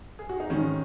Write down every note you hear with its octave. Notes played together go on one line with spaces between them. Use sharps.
G#4
F#4
D#4
G#2 D#3 C#4